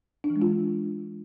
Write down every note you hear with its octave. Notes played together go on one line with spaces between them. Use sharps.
D4
E3
G#3
F4